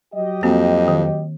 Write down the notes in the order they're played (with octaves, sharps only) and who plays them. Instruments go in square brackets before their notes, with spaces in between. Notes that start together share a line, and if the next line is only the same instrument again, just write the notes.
[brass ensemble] F#3 G4 D#5
[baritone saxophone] F2 [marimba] A#3 C4 F#4
[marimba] D#3